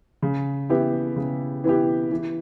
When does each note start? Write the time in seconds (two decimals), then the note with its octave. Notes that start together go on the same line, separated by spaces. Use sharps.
0.22 C#3
0.69 E3 B3 E4 G4
1.16 C#3
1.64 E3 B3 E4 G4
2.12 E3